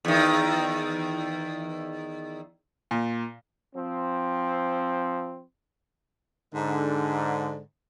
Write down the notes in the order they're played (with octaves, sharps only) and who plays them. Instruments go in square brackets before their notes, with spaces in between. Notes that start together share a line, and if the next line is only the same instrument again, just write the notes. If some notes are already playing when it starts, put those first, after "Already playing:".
[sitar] E2 D#3
[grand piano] A#2
[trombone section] F3 C4
[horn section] G#2 D3